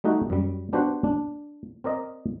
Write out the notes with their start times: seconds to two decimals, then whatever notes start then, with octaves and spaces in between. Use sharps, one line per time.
0.04 G3 A3 D#4 F#4 G4
0.30 F#2 G3
0.73 B3 D4 F#4 G4 C5 F#5
1.04 D4
1.84 C4 A#4 D5 D#5